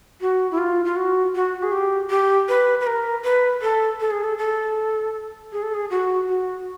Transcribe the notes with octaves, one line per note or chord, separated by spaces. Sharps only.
F#4
E4
F4
F4
F#4
F#4
G#4
G4
G4
B4
B4
A#4
B4
A4
A4
G#4
A4
A4
G#4
A4
G#4
F#4
F#4